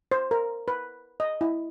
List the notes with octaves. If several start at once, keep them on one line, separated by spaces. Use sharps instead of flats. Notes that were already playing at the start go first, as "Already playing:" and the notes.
C5
A#4
B4
D#5
E4